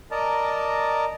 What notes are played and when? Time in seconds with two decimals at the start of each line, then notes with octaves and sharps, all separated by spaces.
0.11 A#4 D5 D#5 A5 A#5